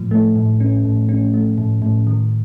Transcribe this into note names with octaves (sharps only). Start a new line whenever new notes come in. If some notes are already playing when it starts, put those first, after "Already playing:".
Already playing: A2 F3
A3
A2
C#4
A2
C#4
A3
A2
A2
D#3